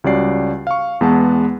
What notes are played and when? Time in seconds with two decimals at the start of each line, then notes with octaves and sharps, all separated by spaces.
0.04 C#2 G3 C#4 F#4 D5 C7
0.67 F5 C#6
1.01 E2 G#3 B3 F#5 A5